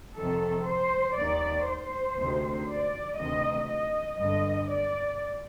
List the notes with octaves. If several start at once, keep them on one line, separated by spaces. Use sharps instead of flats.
F2 C3 D#3 A4
C5
D#2 D#3 D5
C5
D2 C3 D#3
D5
D2 C3 D#3 D#5
D#5
G2 D3 D#5
D5